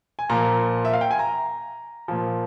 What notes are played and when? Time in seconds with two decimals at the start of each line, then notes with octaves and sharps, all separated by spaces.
0.19 G#5
0.30 A#2 F3 A#5
0.85 E5
0.93 F5
1.01 G5
1.11 G#5
1.19 A#5
2.08 A#2 F3